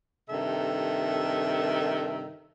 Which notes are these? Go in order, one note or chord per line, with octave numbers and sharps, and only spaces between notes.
G2 C3 D#3 A4 E5